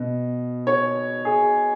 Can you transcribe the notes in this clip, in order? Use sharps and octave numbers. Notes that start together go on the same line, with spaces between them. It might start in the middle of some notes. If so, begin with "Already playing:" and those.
Already playing: B2
C#5
G#4